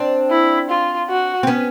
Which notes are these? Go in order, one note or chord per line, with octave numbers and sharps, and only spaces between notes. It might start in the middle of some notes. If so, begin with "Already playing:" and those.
Already playing: C4 D4
E4
F4
F#4
C4
B3 C#4